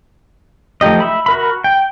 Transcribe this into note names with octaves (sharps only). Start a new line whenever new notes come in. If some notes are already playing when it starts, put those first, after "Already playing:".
F3 A3 D#4 G4 D#5
E5 B5
F#4 A#4 B5
G5